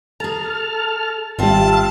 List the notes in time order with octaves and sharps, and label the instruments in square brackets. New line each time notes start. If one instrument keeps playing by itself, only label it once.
[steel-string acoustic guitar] G#4 A#5 [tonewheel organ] A4 A5 F6
[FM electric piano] G#1 D#3 G3 [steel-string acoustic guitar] C4 F4 [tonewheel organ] E5 F5 [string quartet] A5